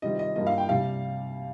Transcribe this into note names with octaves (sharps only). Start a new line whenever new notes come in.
C3 D#3 G3 C4 F4 D#5
D#5
G2 G3 A#3 F4 D#5
F5
G5
C2 C3 G3 F5